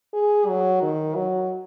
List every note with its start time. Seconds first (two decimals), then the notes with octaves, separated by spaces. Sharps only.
0.14 G#4
0.47 F#3
0.82 D#3
1.15 F#3